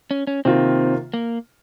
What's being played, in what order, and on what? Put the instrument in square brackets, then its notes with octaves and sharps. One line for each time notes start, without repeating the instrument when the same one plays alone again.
[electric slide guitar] C#4
C#4
[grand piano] C3 D#3 A#3 F4 [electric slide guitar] C4
[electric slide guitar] A#3